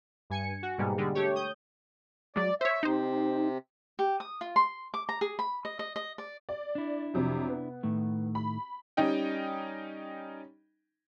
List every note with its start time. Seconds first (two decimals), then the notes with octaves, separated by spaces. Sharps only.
0.30 G2 G#5 C#7
0.63 F#4
0.78 G#2 B2 G3 G#3 A#3
0.98 D3 G3 G#3
1.15 A3 G4 C#5
1.36 D#6 G6
2.36 F#3 G#3 D5
2.61 C5 C#5 E5
2.83 C3 D#4 C5
3.99 G4
4.20 D#6
4.41 F4
4.56 C6
4.94 D6
5.09 A#5
5.21 G#4
5.39 B5
5.65 D#5
5.79 D#5
5.96 D#5
6.18 D5
6.49 D5
6.75 D4 E4
7.14 F2 C3 F#3
7.49 B3
7.83 A2 D#3 A3
8.35 B5
8.97 G3 C#4 D#4 D#5 G5